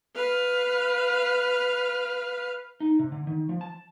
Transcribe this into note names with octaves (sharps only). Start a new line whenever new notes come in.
B4 F5
D#4
C3
D3
D#3
F3
A5